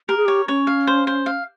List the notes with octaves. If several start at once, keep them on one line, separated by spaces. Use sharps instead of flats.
G4 A#4
G#4
G4 C#5
C#4 C#5
F5
C5
C5
F5